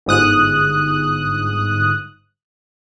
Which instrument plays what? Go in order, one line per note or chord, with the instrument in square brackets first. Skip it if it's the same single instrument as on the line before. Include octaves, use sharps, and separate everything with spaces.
[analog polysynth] G1 G#2 D#6 F#6